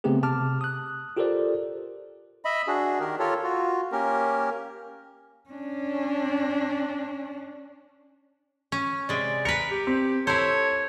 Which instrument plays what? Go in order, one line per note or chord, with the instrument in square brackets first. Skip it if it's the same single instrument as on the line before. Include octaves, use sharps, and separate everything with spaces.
[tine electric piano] C#3 A3 B3 C4 G4 G#4
C3 A5 D6 F6
D#6 F#6
F4 G4 A4 A#4 C5 D5
[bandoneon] D#5 E5 B5
D4 F#4 G#4
D#3 G4 A#4
F4 G4 A4 A#4 C#5
F4 F#4
A#3 C#4 G4 A#4
[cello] C#4 D4
[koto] C#4
[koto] C3 G#3 [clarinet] D5
[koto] A#4 B4 [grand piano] C#7
[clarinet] G4
[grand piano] C4
[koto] E4 C5 [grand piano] A4 A5 [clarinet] C#5